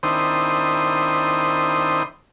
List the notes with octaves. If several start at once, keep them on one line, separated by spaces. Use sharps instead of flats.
D#3 C4 D4 E4 C5 D#6